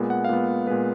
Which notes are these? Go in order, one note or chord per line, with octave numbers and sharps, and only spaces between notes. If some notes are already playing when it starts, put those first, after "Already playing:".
Already playing: A#2 G#3 B3
F#5
F5
A#2 G#3 B3 F#5
A#2 G#3 B3 B4